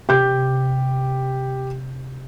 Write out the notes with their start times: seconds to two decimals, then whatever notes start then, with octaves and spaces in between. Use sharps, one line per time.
0.09 C3 G4 G6